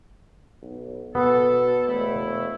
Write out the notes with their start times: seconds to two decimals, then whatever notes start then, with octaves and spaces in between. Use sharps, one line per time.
0.62 B1
1.15 B2 B3 A4
1.86 E1 A3 E4